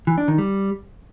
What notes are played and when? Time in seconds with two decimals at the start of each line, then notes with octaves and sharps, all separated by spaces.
0.07 E3
0.18 D4
0.28 D#3
0.38 G3